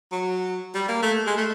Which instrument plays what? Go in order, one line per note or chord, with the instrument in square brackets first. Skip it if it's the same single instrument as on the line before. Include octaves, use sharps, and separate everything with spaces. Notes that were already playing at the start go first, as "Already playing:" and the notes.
[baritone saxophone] F#3
G3
A#3
A3
G#3
A3